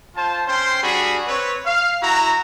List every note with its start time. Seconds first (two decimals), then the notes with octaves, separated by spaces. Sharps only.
0.16 F4 C5 A5
0.48 C#4 C5 G5 C6
0.83 G3 D4 F#4 G#4 B5
1.28 C4 B4 C#5
1.65 F5
2.03 E4 F#4 A#5